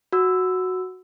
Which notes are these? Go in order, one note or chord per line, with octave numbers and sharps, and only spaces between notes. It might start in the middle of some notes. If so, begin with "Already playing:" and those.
F#4 E6